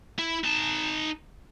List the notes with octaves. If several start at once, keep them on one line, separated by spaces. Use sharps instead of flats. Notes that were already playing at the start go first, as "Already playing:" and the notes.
E4
D#4 A5